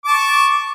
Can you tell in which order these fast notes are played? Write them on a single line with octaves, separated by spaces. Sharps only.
D6 A5 C#6